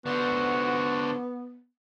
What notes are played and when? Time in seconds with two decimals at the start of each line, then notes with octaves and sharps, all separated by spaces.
0.06 D3 B3 F#4 C5